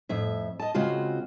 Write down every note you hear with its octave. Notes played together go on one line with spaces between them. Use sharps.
F2 A2 E5
D#5 A5
C#3 G#3 C4 F4 F#4